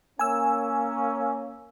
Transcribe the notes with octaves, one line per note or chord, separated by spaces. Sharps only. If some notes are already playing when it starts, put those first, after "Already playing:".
A#3 C#4 G#5 E6